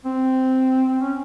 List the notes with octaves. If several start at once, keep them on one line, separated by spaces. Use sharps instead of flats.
C4
C#4